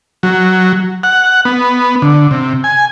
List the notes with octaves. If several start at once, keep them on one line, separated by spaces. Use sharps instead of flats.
F#3
F#5
B3
D3
C3
G#5